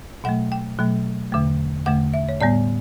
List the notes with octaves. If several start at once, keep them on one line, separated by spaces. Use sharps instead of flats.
B2 F#3 A3 F#5
G5
B2 F#3 A3
E2 D3 A3
E2 D3 A3 F#5
E5
C#5
A2 G3 B3 D5